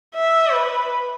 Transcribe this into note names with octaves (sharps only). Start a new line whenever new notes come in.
E5
B4